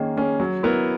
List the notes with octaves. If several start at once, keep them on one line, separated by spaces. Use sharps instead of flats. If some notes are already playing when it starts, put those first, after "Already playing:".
Already playing: D#3 A#3 C#4 G#4
A#3 C#4 G#4
F#3
B3 E4 A#4